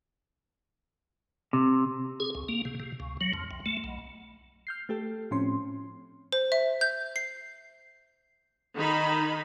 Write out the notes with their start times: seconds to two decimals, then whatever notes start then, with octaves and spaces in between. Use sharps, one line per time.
1.53 C3
2.20 G#4
2.35 C#2
2.49 A#3
2.65 C3
2.80 C3
3.00 C#2
3.21 F#3
3.33 F2
3.51 C2
3.66 A3
3.84 B1
4.67 F6 G6 C7
4.89 A3 G4 A4
5.31 A2 F3 C4 C#4 C6
6.33 C5
6.52 E5
6.81 G6
7.16 C7
8.77 D#3 D#4 B5